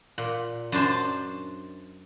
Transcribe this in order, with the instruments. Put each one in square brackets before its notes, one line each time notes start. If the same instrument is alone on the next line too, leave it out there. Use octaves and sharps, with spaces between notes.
[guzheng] A#2
F#2 D4 C5 A5